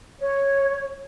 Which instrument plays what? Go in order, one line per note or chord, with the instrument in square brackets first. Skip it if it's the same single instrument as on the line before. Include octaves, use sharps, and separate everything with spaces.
[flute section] C#5